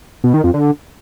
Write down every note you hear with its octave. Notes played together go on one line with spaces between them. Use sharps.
B2
D#3
F2
D3